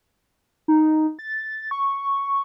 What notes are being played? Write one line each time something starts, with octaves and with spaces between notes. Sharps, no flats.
D#4
A6
C#6